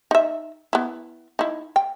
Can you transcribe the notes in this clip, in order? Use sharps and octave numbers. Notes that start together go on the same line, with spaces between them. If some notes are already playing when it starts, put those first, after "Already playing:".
D#4 E5
B3 E4
D#4 E4
G5